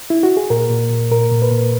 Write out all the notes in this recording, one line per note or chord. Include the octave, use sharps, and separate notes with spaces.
E4
F#4
G#4
A#2 A#4
A#2
A#2
A#2 A#4
A#2
B4
A#2